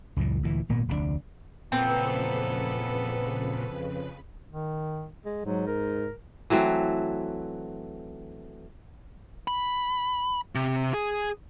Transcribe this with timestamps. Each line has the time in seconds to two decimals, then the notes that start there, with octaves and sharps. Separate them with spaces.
0.16 C#2 F#2 A#2 E3
0.43 D2 A#2 C#3 E3
0.69 G#1 A#2 A#3 B3
0.88 F1 D2 A#2 D4
1.72 F2 A#2 C#3 E3 B3 C4 A4 B4
4.51 D#3
5.25 G#3
5.45 G#2 F#3
5.67 A#4
6.50 E3 F#3 A3 C4
9.48 B5
10.55 C3
10.94 G#4